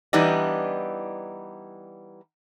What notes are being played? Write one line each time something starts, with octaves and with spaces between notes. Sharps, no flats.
E3 G3 B3 D4 D#4